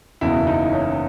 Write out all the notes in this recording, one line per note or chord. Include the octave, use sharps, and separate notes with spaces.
F#1 E2 B2 E4
D#4
C#4